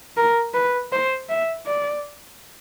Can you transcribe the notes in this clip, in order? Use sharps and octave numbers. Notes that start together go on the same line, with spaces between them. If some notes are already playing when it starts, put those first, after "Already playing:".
A#4
B4
C5
E5
D5